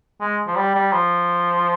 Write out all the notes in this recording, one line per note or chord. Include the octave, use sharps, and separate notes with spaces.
G#3
F3
G3
G3
F3